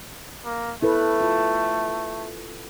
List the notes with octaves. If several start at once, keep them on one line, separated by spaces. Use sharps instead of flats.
A#3
A3 E4 A4 B4
F4